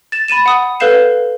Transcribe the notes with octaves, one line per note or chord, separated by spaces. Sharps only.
A6 E7
B5 A6 D#7 E7
F#5 D#6
A4 B4 F5 G6 C7 E7